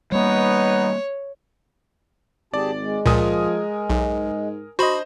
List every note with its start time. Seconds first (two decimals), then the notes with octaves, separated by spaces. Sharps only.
0.12 G3 A#3 B3 D#4 B4 C#5
2.54 G#1 G4 G#4 D5 A5
2.82 G#3
3.06 C#2 A#2 F3 A#4 G#5 D#6
3.90 B1 G#2
4.79 D4 F#4 C5 D#5 B5